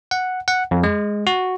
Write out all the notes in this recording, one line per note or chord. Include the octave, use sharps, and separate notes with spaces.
F#5
F#5
F2
G#3
F#4